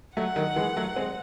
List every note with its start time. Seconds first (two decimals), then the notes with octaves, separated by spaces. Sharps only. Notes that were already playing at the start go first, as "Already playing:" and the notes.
0.16 F#3 A3 F#5
0.36 D#3 F#3
0.56 E3 G#3
0.76 F#3 A3
0.96 G#3 C4